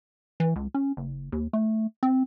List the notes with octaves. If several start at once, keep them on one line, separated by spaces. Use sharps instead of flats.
E3
C#2
C#4
F#1
D#2
A3
C4